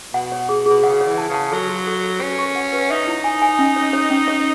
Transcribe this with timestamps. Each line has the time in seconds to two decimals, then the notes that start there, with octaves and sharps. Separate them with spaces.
0.14 B2 F#5
0.32 C#5
0.49 G#4
0.66 B2 G#4
0.83 C#3 F#5
1.01 C#5
1.07 E3
1.18 A5
1.29 C#3
1.34 A5
1.52 F#3 A4
1.69 F#4
1.87 A4
2.04 A4
2.21 C#4 B4
2.39 C#6
2.56 F#5
2.73 B4
2.90 D#4 E5
3.07 E4
3.24 G#5
3.42 G#5
3.59 C#4
3.76 C#5
3.93 C#5
4.11 C#4
4.28 C#5